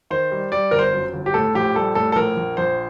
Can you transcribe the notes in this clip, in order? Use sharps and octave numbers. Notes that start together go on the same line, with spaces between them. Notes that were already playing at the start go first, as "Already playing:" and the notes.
D#3 C5
G3
G3 D5
G1 A#4
C5
F#2
G1
G4
A2 A4
A#1 G4
G3 A4
A2 A4
A4
A#1 A#4
A#1
A#1 C5